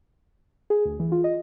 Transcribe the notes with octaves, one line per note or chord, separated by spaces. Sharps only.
G#4
D2
E3
F4
D#5